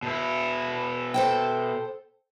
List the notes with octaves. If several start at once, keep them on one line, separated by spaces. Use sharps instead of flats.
B2 E4
A4 C5 G5